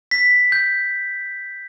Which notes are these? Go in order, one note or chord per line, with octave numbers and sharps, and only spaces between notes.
B6
G6